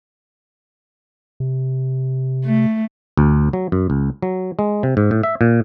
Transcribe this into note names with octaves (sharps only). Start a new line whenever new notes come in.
C3
A3
D2
F#3
F#2
C#2
F#3
G#3
C3
G#2
A2
E5
A#2